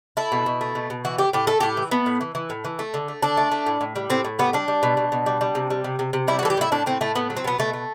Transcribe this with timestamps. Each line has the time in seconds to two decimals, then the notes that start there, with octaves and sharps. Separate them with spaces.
0.17 A3 E4
0.32 B2
0.46 B2
0.61 A3
0.75 B2
0.90 B2
1.05 E3 F#4
1.18 A2 G4
1.33 A2 G4
1.47 A3 A4
1.60 A2 G4
1.77 E3
1.91 A3 B3
2.06 A2
2.21 E3
2.35 E3
2.50 A2
2.65 E3
2.79 A3
2.94 D3
3.08 A3
3.23 D3 D4
3.37 A3
3.52 A3
3.66 A2
3.81 A2
3.96 G3
4.10 A2 C4
4.25 A2
4.39 G3 B3
4.53 G3 D4
4.68 G3
4.83 B2
4.97 B2
5.12 B2
5.26 G3
5.41 G3
5.55 C3
5.70 G3
5.84 C3
5.99 C3
6.13 C3
6.28 G3 E4
6.39 F#4
6.43 E3 A4
6.50 G4
6.57 A2 E4
6.72 A2 D4
6.86 A2 C4
7.01 A2 A3
7.15 A3 B3
7.30 F#3
7.37 C4
7.44 B2 B3
7.59 B2 A3
7.73 A3